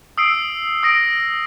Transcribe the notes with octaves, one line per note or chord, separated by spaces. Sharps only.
D#6 E6 C7 D7
D#6 A#6 D7